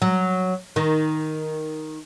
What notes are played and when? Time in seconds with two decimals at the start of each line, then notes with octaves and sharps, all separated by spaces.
0.02 F#3
0.76 D#3